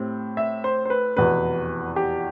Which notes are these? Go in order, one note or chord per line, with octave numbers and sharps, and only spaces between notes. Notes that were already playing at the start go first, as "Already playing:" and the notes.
Already playing: A2 C4 G4
E5
C5
C5
B4
F1 E2 B2 B4
G4